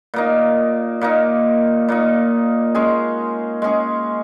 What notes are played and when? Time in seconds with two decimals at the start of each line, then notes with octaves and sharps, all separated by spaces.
0.14 A#2 A#3 D#4
1.01 A#2 A#3 D#4
1.88 A#2 A#3 D#4
2.75 G#3 C#4 G#4
3.62 G#3 C#4 G#4